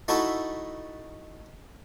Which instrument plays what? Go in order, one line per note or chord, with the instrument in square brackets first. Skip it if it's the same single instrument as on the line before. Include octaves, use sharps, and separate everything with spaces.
[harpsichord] A3 D#4 E4 F#4 A4 E5